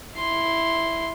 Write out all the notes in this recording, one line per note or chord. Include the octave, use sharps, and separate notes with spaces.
E4 C6